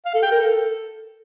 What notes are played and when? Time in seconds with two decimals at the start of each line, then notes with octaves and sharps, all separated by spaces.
0.05 F5
0.14 A4
0.23 G5
0.31 A#4
0.40 A4